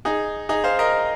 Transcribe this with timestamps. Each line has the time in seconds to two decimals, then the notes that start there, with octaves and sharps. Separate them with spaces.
0.05 D#4 G#4
0.49 D#4 G#4
0.64 C5 F5
0.79 A#4 D#5